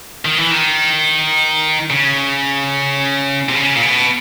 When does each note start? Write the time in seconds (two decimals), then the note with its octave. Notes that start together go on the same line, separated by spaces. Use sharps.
0.25 D#3
0.38 E3
0.51 D#3
1.90 C#3
3.49 C3
3.55 C#3
3.75 A#2
3.82 B2